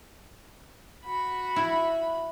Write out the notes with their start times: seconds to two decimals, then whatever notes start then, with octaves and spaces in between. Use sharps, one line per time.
1.04 F#4 B5
1.56 E4